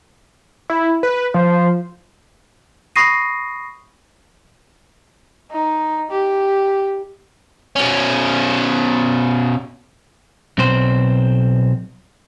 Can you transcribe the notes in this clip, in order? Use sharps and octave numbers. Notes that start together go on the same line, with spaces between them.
E4
B4
F3 C5
B5 C#6 D#6 A#6 C7 D#7
D#4
G4
B2 C#4
B1 C4 C5